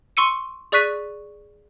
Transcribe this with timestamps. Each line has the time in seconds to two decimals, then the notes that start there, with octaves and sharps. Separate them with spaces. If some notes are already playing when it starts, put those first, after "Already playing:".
0.17 C6 C#6 E6 C#7 D#7
0.72 G#4 D5 C#6 F#6 B6 D#7